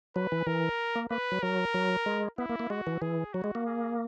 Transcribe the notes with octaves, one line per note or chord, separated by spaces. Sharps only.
F#3 B4
E3
E3 A#4
A#3
A#3 B4
F#3
F#3 A#4
F#3
G#3
B3 E4
A#3
A#3
G#3 F#4
E3
E3 G#4
F#3 F#4
G#3
A#3
G#4